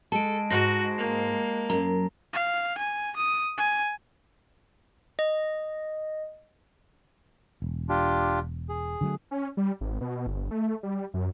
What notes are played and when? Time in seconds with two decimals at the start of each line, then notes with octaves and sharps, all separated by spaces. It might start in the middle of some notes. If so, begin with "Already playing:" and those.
0.12 G#3 A4 A5 D7
0.51 G#2 F#4 C5 A#6
0.98 A#3
1.70 F#2 A#5
2.33 F5
2.78 G#5
3.16 D#6
3.58 G#5
5.19 D#5
7.62 E1
7.89 D4 F4 G4
8.69 G#4
9.01 D3 F#3 A3
9.31 C#4
9.57 G3
9.81 G#1
10.01 B2
10.27 G1
10.51 A3
10.83 G3
11.14 F#2